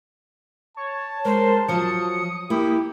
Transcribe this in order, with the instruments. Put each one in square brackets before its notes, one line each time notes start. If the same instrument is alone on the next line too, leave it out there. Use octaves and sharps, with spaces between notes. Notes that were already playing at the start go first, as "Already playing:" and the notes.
[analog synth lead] C#5 [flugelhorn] A5
[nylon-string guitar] G#3 [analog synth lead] A#4 [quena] C5
[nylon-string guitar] F3 F#3 [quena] D#6 [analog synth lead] C#7
[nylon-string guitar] A#3 [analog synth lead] E4 [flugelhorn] G4